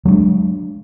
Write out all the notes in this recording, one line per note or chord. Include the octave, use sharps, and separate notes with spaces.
F#3 G#3 C4 D4